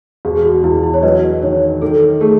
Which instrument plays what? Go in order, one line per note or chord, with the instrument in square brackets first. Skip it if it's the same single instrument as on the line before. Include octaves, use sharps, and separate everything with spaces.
[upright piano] E1 [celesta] G#4
[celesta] G#4
F#4
[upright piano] E1 [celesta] E4
[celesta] E4
C#5
[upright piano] F#3 [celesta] B4 D#5
[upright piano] D#3 [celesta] C#5
[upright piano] D#3 [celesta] A4
[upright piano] A3 [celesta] G#4